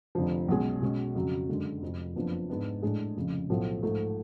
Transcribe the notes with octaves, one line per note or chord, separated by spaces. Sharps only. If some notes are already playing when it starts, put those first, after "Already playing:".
F1 F2 D3 F3
B1 B2 G#3 C#4 G#4
B2 G#3 C#4
F2 C#3 F#3
F#2 D3 G#3
F1 F2 F3
F#1 F2 F3 B3 D4
G#2 G#3 B3 D4
A2 G#3 D4 G#4
F1 F2 C#3
B1 A2 F3 A3
G#2 F3 A3